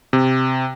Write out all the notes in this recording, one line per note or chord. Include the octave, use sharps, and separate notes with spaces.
C3